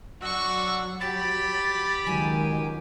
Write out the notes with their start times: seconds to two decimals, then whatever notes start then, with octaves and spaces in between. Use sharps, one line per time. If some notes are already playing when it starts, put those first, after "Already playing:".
0.22 F#3 D4 F#4 D5 F#5 C#6 E6
1.01 G4 B5 A6
2.07 C#2 D#3 F#3 G#5